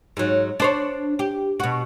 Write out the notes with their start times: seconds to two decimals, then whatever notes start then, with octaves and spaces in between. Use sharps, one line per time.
0.17 G#2 F#3
0.60 D4 C5 C#5
1.19 G4
1.60 B2 F#4